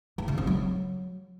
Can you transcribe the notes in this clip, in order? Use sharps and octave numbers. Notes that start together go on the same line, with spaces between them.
E3
C#3
C4
F#3